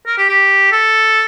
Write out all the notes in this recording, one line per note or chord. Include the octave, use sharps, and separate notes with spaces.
A#4
G4
G4
A4